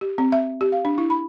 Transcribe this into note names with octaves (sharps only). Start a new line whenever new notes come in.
G4
C4
E5
G4
F5
D4
E4
B5